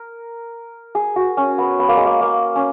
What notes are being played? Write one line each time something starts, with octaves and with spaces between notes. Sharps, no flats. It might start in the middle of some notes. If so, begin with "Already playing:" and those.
Already playing: A#4
G#4
F#4
C#4
B3
B3
A#3
G#3
A#3
A#3
C#4